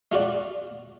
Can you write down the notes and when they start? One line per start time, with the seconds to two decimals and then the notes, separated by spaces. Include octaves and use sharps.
0.12 G#3 F4 F#4 D5